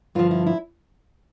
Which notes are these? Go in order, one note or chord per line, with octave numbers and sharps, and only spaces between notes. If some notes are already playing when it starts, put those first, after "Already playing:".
G2 D3 F3 F4
E4
E4